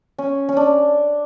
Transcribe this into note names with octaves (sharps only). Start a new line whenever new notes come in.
C#4
C#4
D4